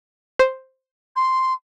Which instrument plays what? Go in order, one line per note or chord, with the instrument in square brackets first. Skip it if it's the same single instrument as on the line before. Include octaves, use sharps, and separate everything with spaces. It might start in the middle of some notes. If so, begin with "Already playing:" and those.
[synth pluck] C5
[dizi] C6